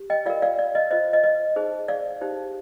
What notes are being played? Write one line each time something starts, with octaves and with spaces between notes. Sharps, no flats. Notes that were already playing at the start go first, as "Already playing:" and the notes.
Already playing: G4
D#5 G5
F4 A#4 D5 F5
D5 F5
D5
D#5
F4 C5 D#5
D#5
D#5
D#4 G#4 C5
D5 F5
D#4 G4 C5